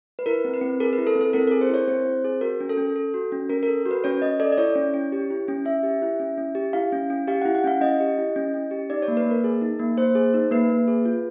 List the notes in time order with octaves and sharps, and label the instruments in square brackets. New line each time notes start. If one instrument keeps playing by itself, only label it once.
[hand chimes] B4
E4 A#4
C4
B4
C4
G#4 A#4
B4
E4
A4
C4
A4
C4 A#4
G#4 A#4
C5
E4 C#5
C4 C5
C4
G#4
F#4 A#4
C#4
A4
C#4
A4
F#4
C#4
C#4 A#4
A#4
A4
F#4
B4
C#4 C#5
C#4 D#5
A4 D5
D5
E4 C#5
C#4
C#4
G4
E4
C#4
C#4 E5
G4
E4
C#4
C#4
G4
E4 F5
C#4
C#4
G4 F5
E4 F#5
F#5
C#4 F5
C#4 D#5
G4
E4
C#4
C#4
G4
D#4 D5
C#5
A#3
B4
A#3 A#4
G#4
D#4
A#3
A#3 C5
G#4
D#4
A#3 B4
A#3
G#4
F4